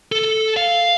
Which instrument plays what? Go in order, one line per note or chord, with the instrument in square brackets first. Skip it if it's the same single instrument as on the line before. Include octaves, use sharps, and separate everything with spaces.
[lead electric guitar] A4
F5